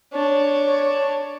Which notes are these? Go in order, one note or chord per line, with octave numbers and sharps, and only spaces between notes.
D4 C#5